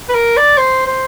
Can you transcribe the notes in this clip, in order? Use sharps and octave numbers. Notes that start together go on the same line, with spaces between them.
B4
A#4
D5
C5
C5